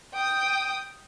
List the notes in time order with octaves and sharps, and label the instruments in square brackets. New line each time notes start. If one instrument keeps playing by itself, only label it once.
[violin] G5 D#6